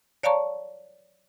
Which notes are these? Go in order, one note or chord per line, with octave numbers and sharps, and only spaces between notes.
C#5 D5 F5 A5 A#5 C#6